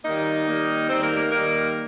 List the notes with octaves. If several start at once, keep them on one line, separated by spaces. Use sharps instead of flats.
D#2 D#3 G3 A#3 D#4 D#5
D#2 D#3 G3 A#3
D#2 D#3 G3 C4 D#4 C5
A#3 A#4
A#3 A#4
D#2 D#3 G3 A#3 D#4 A#4